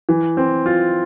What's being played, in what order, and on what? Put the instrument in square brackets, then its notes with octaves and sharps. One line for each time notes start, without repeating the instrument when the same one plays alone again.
[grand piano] E3
C4
F4